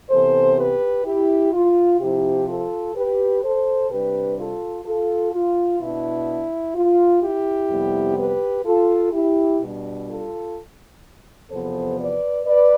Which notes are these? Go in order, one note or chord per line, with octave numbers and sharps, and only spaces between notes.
C3 E3 B3 A4 C5
G4 B4
E4 G4
F4
C3 F3 C4 E4 G4
F4 A4
G4 B4
A4 C5
C3 G3 D4 G4 B4
F4 A4
F4 A4
F4
B2 B3 D4 E4
F4
E4 G4
F2 C3 G3 B3
G4 B4
F4 A4
E4 G4
B2 G3 D4
F4 A4
E2 C3 F3 B3 A4 C5
B4 D5
B4 D5